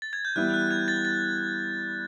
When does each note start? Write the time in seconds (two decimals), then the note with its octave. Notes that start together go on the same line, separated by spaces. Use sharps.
0.02 A6
0.13 G#6
0.25 G6
0.36 E3 G3 B3 E4 F#6
0.54 F#6
0.71 G#6
0.88 A6
1.05 A6